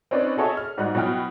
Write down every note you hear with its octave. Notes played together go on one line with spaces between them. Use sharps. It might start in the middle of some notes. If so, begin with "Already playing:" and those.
C4 C#4 D#4 B4 D5
F#4 G#4 A4 C#5 D#5 E5
F6
G#2 G3 D#4 F#4 F#6
B2 F#3 E4 G5 F6